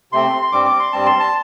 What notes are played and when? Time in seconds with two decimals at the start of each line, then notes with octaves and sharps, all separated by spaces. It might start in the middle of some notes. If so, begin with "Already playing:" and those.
0.12 C3 A3 C4 C6
0.42 C6
0.52 G2 G3 C4 D6
0.65 D6
0.79 C6
0.93 G2 G3 C4 A5
1.06 C6
1.20 A5